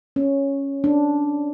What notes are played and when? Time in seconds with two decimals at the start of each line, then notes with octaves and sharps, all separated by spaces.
0.16 C#4
0.84 D4